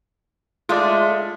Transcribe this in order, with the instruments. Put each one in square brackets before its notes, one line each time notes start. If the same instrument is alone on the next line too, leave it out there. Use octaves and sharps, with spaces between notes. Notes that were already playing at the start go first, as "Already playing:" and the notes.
[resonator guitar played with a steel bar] G#3 A3 [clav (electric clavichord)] F4 D5